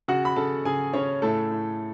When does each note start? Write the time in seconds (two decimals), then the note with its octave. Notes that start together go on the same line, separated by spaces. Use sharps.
0.08 C#3 F#4 F#5
0.25 B5
0.36 C#3 A4 A5
0.65 C#3 G#4 G#5
0.93 C#3 C#4 C#5
1.22 A2 A3 A4
1.51 A2